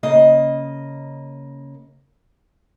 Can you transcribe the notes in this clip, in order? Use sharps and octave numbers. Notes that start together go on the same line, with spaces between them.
C#3 A#3 D#5